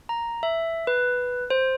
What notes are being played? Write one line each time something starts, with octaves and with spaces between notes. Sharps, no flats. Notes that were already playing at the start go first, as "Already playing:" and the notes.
A#5
E5
B4
C5